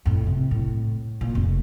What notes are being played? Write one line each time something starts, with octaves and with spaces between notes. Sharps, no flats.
F2 A2
C3
A2
A#2
F1 A3